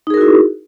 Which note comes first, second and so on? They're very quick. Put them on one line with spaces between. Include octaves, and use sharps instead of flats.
D#4 G#4 A#4 F#4 E4